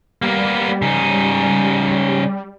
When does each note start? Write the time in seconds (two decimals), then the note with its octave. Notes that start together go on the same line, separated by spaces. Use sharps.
0.22 G3 A#3 B3
0.82 C#3 D#4